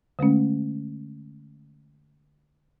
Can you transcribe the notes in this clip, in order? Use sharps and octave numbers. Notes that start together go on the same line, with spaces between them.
D3 G#3 A3 C#4